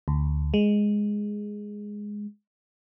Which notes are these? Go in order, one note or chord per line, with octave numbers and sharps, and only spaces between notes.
D2
G#3